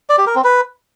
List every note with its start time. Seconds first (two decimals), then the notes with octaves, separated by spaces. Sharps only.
0.09 D5
0.18 G4
0.27 A#4
0.35 C4
0.44 B4